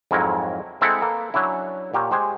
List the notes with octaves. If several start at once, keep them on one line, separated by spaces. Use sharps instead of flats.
F2 G#2 F#3 E4 A#4 C#5
G#3 C4 E4 A4 F#5
A#3 A4 B4
F#3 C#4 D4 E4
A#2 G4 A#4 C#5
G#3 G4 C5 G5 G#5